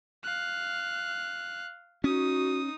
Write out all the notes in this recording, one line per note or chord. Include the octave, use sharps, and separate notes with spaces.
F5 F#6
C#4 D#4 F#4 D#6